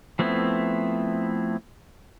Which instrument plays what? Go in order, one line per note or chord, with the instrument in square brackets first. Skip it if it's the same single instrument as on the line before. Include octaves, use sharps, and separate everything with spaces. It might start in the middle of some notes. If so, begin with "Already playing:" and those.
[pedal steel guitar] F3 A3 B3 C4 E4